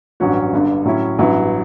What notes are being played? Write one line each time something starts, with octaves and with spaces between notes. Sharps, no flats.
A1 G2 F#3 C#4 F#4
G1 G2 D3
A2 F#3 C#4 E4
A1 G2 F#3 B3 E4